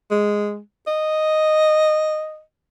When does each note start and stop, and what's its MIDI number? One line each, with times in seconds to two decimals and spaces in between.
0.11 0.59 56
0.87 2.42 75